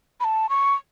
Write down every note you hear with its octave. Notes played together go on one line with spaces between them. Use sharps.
B5
A5
C#6